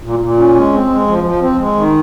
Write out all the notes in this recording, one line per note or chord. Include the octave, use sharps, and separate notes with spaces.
A#2
A#2
C#4
G#3
C4
G#3
F3
F3
C4
G#3
D#3